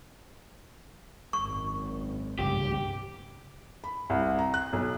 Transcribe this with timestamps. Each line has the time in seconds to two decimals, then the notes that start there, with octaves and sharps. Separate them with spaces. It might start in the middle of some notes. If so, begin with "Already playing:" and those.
1.33 G#1 F#2 C#6
2.39 C2 G2 C#3 G4
3.84 B5
4.10 C2
4.39 A#5
4.54 F#6
4.73 B1